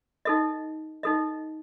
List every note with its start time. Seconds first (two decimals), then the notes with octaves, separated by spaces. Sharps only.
0.25 D#4 A4 D#5
1.03 D#4 A4 D#5